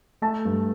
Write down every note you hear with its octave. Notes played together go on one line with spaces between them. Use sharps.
A3 A5
G2